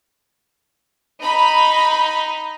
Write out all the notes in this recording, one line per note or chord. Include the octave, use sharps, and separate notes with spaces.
D#4 B5